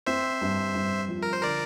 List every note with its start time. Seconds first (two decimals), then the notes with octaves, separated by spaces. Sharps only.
0.07 C4 C5 E5
0.42 G2
0.75 G2
1.08 F3
1.22 A#4
1.33 C5
1.43 D3 A#4 D5